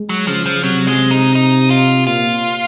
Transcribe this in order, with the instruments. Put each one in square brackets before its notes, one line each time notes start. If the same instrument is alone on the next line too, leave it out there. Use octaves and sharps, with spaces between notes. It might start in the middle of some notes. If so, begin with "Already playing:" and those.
Already playing: [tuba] G#3
[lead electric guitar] F#3
[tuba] C#3 [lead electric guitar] F3
[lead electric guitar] F3
[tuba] C3 [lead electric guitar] F#3
[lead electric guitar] G#3
D#4
D#4
F4
[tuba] A#2 [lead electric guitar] F4